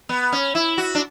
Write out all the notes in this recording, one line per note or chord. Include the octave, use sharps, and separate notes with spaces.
B3
C#4
E4
F#4
D4